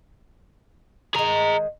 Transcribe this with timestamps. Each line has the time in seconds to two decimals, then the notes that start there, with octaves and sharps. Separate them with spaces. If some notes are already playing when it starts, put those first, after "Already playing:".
1.15 D#3 G#3 G#4 A#5